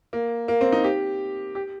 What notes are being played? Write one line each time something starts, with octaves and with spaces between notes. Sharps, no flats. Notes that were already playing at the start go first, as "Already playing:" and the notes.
A#3
A#3
C4
D#4
G4
G4